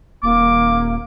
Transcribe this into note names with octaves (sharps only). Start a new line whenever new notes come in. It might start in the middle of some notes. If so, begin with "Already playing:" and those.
D#1 A#3 D6